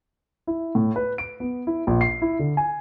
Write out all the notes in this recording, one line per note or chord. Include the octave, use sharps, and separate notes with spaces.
E4
A2
B4
D7
B3
E4
A#1
C7
E4
D3
G#5